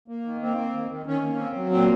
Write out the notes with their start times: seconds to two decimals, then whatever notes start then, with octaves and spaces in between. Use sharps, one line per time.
0.08 A#3
0.25 D#3
0.41 A#3 C4
0.57 A#3
0.74 D#3
0.90 D#3
1.06 D#3 C#4
1.23 A#3
1.39 C4
1.55 F#3
1.71 A#2 C4